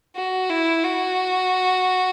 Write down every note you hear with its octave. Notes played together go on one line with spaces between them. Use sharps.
F#4
E4
F#4